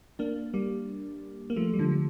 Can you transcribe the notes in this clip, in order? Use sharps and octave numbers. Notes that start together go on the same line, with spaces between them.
A#3 D4
G3 A#3
A#3
F3 A3
G3
D3 F3
F3